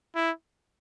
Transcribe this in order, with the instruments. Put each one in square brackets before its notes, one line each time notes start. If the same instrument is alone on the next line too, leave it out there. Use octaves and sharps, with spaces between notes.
[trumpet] E4